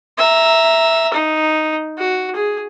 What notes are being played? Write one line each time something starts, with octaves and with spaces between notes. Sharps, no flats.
E5 A#5
D#4
F#4
G#4